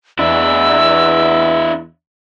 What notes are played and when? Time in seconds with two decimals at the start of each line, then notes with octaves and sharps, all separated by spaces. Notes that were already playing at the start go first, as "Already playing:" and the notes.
0.19 E2 D4 E4 E6